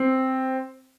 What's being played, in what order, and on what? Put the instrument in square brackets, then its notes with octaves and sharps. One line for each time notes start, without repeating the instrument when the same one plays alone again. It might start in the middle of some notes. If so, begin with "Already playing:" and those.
Already playing: [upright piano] C4